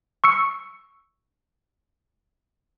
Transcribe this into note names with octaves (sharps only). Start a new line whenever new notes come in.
C#6 E6 C#7